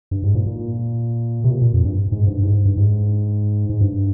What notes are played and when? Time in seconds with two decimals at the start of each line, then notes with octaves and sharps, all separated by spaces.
0.11 G2
0.24 G#2
0.35 A#2
0.47 A#2
1.44 C3
1.50 A#2
1.62 A#2
1.73 F2
1.84 G2
2.12 G#2
2.28 G2
2.43 G#2
2.65 G2
2.77 G#2
3.69 G#2
3.81 G2